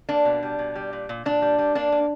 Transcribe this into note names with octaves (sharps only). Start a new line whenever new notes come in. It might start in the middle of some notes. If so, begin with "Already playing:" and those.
A#3 D4
B2
G3
B2
G3
A#2
A#2
A#2 D4
G3
G3
A#3 D4
A#3